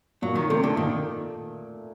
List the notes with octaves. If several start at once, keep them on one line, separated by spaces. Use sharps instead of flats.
A#2 F#3
D#3
C3 A3
D3
A#2 D#3